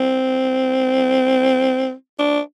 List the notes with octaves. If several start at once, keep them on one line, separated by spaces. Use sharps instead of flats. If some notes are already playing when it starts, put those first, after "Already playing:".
Already playing: C4
D4